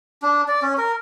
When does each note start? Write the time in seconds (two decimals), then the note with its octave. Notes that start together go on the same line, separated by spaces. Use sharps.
0.23 D4
0.48 D5
0.62 C#4
0.78 A#4